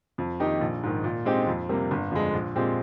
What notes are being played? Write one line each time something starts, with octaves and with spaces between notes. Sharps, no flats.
F2
D#3 A#3 D#4 G4
A#1
G#2 D#3
A#2
G#3 C4 D#4 G4
F2
C3 G3 A#3
G1
F2 D3 G#3
A#1
A#2 G#3 C4 G4